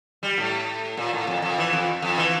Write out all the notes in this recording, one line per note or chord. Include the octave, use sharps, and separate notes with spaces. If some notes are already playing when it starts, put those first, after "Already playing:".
G3
A2
A#2
A2
F2
F2
E3
F2
F2
E3